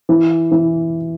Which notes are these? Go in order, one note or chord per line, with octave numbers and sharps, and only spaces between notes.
E3
E3